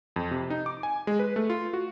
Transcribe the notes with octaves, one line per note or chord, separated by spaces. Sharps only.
F2
C3
D#4
D6
G#5
G#3
B4
A3
F4
F#4